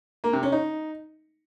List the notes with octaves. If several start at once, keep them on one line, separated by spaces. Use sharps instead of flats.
A#3
C3
C#4
D#4